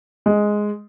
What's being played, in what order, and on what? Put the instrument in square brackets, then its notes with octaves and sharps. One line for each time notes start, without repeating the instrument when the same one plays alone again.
[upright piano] G#3